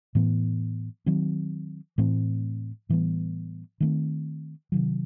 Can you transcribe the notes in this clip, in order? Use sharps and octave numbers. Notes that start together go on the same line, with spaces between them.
A2 E3 B3
D#3 F#3 C4
A2 E3 A3 C4
A2 E3 G3 B3
D#3 A3 C4
C3 D#3 F#3